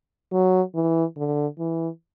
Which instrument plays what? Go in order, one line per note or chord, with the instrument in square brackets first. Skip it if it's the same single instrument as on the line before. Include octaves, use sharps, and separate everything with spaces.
[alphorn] F#3
E3
D3
E3